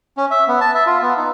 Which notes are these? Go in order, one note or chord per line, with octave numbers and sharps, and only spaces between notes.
C#4
E5
B3
A5
E5
F4
B3
D#4